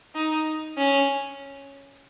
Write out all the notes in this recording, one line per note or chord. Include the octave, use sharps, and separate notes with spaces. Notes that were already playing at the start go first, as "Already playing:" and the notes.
D#4
C#4